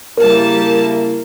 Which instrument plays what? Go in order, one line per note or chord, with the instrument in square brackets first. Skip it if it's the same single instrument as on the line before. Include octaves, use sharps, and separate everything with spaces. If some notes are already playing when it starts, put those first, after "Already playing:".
[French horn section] C#3 A#3 E4 [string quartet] G3 A5 [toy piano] A#4